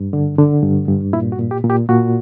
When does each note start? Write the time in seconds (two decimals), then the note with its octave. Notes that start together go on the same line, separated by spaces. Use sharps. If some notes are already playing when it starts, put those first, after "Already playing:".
Already playing: G2
0.13 D3
0.38 D3
0.63 G2
0.88 G2
1.13 A#2 E4
1.32 F#4
1.39 A#2
1.51 G4
1.64 A#2
1.70 G4
1.89 A#2 F#4